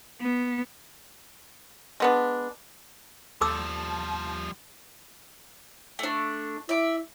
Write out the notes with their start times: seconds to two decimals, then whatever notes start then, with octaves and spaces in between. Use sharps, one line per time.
0.21 B3
2.00 G#3 B3 D4
3.41 D#2 F3 G3 A4 A5 D6 E6
5.99 A3 D4
6.69 E4 D5 E5